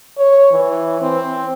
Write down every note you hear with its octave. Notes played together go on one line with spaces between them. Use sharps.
C#5
E3
C4